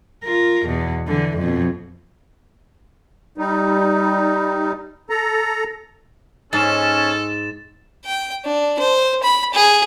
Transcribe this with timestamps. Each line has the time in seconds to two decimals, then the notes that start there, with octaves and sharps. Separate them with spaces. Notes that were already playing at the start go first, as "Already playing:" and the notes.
0.24 F4 A#4
0.66 E2 B2
1.07 D3 E3
1.38 F2 B2
3.38 G3 D#4
5.10 A4 A#5
6.53 G#2 C#4 A4 A6 E7
8.06 G5
8.44 D4
8.79 C5
9.23 B5
9.54 G#4